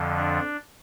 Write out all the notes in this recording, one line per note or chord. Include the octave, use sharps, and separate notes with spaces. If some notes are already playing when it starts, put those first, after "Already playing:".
Already playing: F2 D3 F3
D4